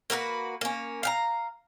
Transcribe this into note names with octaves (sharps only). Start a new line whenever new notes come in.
A#3 F#4 A#4 B4
A#3 C#4
F5 G5 A#5